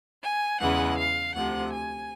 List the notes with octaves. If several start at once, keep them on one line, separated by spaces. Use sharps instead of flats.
G#5
E2 C#3 E3 G#3 F#5
F5
D2 C3 F3 F#5
G#5